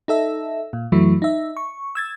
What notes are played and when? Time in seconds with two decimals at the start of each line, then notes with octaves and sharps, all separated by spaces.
0.08 D#4 A4 E5
0.73 A#2
0.92 F#2 E3 F#3 A3 E4
1.22 D#4 E5
1.57 C#6
1.95 E6 G#6 A6